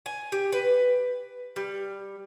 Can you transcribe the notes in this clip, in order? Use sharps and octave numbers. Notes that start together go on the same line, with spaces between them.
G#5
G4
B4
G3